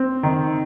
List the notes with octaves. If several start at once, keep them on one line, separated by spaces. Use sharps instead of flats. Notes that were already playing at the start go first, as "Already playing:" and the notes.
Already playing: C4
D#3